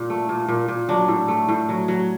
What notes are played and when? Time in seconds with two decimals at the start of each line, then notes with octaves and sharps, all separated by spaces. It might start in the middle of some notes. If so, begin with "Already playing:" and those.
Already playing: A#2
0.10 A3
0.29 A#2
0.48 A#2
0.68 A#2
0.89 F#3 D4
1.08 A2
1.28 A3
1.49 A2
1.69 F#3
1.88 F#3